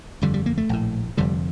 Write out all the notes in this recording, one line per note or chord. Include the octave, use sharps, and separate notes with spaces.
G1 F2 D3 G3
G3
A#3
A3
A#1 A2
F1 F2 D3 G3